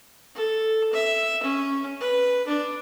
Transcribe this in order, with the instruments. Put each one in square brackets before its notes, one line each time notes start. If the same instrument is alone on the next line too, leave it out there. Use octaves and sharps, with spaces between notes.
[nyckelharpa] A4
E5
C#4
B4
D4